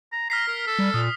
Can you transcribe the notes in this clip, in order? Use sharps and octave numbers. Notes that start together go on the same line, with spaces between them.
A#5
A#5 F6 B6 C7
A#4
A4
G3
A#2 D#6